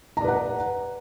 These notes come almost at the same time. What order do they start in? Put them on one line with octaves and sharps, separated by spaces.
A#5 D5 B4 F#5